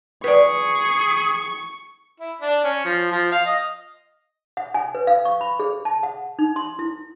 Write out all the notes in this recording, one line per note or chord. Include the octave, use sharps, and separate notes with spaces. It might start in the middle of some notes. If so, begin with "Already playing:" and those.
G#4 B4 D5 C#6
E4
D4
C#4
F3
F3
F5
D#5
F#5
G#5
B4
F5
C#6
B5
G#4
A5
F#5
D#4
C6
E4